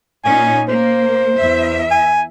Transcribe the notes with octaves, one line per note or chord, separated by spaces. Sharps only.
A#2 C#4 D#4 G#5
A#3 C5
E2 E5
G#5